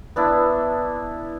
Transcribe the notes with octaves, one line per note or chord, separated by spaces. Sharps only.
B3 D4 E4